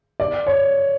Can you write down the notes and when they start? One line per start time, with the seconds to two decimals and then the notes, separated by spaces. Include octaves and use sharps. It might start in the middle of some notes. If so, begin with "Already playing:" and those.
0.20 D5
0.47 C#5